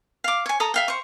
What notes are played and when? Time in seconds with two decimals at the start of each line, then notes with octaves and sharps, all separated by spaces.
0.24 F5 D6
0.46 C#5 G#5
0.60 A4 A#5 D#6
0.74 E5 F5 G5
0.88 C5 C#6